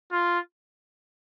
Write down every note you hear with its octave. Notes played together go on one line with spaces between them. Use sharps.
F4